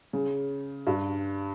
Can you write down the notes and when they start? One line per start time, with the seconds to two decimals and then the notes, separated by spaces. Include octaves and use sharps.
0.13 C#3
0.87 G2